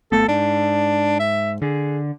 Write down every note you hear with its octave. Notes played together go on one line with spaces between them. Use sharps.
G#1 A3 B3 A4
G#2 D4
E5
D3 G#4